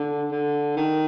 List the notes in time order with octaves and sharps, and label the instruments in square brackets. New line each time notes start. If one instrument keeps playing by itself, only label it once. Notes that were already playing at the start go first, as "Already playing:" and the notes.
Already playing: [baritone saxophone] D3
D3
D#3